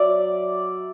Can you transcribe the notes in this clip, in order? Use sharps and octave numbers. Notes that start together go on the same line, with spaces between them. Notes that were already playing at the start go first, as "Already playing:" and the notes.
Already playing: F#3 D5 E5